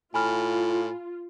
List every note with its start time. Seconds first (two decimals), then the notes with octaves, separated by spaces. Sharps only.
0.14 A2 F4 G#5 B5 F6